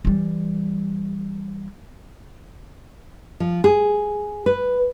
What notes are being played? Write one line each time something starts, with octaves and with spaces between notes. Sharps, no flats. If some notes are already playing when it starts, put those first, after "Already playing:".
E3 G3
F3
G#4
B4